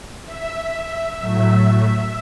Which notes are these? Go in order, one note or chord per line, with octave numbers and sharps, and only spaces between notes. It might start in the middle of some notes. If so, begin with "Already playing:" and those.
E5
A2 F#3 A3